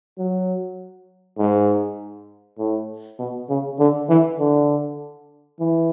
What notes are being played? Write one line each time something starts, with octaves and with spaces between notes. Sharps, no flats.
F#3
G#2
A2
B2
C#3
D3
E3
D3
E3